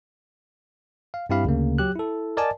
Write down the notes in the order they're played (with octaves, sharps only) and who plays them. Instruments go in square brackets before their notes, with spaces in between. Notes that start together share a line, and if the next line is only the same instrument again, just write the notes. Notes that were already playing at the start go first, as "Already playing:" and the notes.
[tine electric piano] F5
G2 C4 E4 G4 F5 B5
D2 C#3 A#3
F#3 G4 F#6
E4 A4
A#4 D5 D#5 G#5 A5